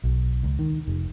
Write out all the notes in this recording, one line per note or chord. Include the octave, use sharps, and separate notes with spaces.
B1
C#2
D#3
F1